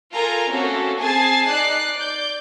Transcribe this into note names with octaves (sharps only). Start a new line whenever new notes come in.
F4 A4 A#4 G#5 A#5
A3 A#3 C4 C#4 F#4 A4
C4 G#4 G#5 A5 A6 C7
D#4 D5 F#6 C7
D5 G6